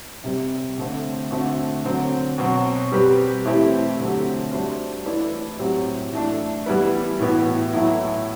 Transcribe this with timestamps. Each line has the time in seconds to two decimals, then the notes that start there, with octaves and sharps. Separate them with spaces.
0.24 C3 G3 C4
0.78 D3 A3 C4
1.31 D3 A3 C4 F#4
1.84 D3 F#3 C4
2.38 B2 F#3 C4 F#4
2.92 G3 C4 G4 B4
3.45 E3 A3 C4 E4 G4
3.99 D3 F#3 A3 C4 G4
4.51 G3 D4 F#4 C5 E5
5.06 E3 A3 E4 B4 D5
5.59 A2 F#3 C4 G4
6.13 E3 A3 D4
6.66 E3 G3 B3 E4 B4
7.19 A2 E3 B3 F#4
7.73 A2 F#3 A3 E4